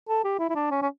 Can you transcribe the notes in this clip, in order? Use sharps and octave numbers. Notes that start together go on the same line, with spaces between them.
A4
G4
E4
E4
D4
C#4
C#4